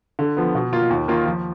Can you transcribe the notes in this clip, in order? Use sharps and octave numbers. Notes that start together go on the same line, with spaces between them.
D3
F3 B3
B2
A#3 F4
D#2
D#3 A#3 F4
F3